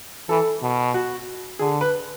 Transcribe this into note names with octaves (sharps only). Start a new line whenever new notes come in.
E3 A4
B2
F#4
D3 G#4
B4